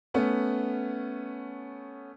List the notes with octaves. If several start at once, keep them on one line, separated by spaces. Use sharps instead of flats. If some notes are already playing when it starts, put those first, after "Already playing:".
A3 B3 C#4